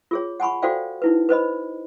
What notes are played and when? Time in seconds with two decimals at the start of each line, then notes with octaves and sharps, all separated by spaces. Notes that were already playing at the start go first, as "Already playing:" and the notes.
0.11 F4 G#4 C#5
0.40 F#5 G#5 B5 C#6
0.62 F#4 A4 C5 D5 F5 G5
1.02 D#4 E4 B4
1.29 B4 C5 D#5 B5